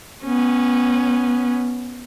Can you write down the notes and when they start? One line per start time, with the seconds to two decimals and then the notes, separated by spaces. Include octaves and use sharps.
0.24 B3 C#4